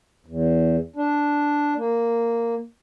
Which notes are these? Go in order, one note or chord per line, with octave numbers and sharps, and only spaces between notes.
E2
D4
A#3